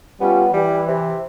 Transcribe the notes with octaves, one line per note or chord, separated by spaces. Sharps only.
G3 B3 C#4 F4
E3 G3
C3